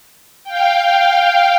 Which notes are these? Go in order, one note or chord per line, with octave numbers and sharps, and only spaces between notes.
F5 G5